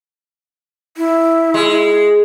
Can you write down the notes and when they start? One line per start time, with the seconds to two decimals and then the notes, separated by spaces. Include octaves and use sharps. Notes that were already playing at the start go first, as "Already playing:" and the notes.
0.97 E4
1.54 G#3